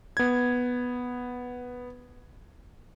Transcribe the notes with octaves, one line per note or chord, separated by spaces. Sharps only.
B3 G#6